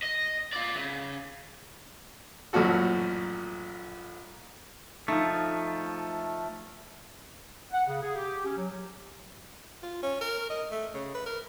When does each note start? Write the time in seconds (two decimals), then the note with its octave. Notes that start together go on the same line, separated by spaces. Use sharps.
0.03 D#5
0.53 F4 D5
0.76 C#3
2.53 A1 F#2 A#2 F3 F#4 A4
5.08 F3 A3 D#4
7.72 F#5
7.87 C#3
8.01 G#4
8.15 G4
8.44 C#4
8.56 F#3
9.83 F4
10.03 C#4
10.21 A#4
10.50 D#5
10.71 A3
10.94 C#3
11.14 B4
11.26 A#4